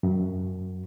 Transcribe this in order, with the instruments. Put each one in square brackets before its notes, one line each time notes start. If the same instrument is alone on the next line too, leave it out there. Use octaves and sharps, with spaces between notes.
[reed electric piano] F#2